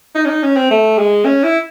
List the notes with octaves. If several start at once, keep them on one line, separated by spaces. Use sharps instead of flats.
D#4
C#4
D#4
C#4
C4
A3
G#3
C#4
E4